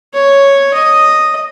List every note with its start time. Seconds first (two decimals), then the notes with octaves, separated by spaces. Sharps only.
0.14 C#5
0.74 D#5